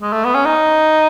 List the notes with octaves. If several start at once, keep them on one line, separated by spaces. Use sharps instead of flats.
G#3
A3
B3
C#4
D#4